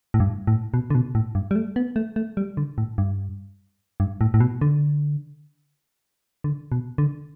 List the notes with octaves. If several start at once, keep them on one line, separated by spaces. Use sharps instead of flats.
A2
G2
A2
B2
D3
B2
A2
G2
G3
A3
B3
A3
A3
G3
D3
A2
G2
G2
A2
A2
B2
D3
D3
B2
D3